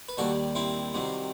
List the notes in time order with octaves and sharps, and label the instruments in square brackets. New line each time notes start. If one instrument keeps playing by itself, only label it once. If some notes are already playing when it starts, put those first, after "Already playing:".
[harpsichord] B4
D#2 D#3 G3 F#4 A4
C4 E4
C2 C3 D#3 F#3